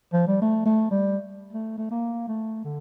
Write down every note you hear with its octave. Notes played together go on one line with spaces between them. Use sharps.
F3
G3
A3
A3
G3
A3
A3
A#3
A3
D3